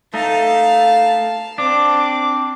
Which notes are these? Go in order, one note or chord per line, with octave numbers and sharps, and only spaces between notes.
A3 D#4 F5 A5
C4 D4 D6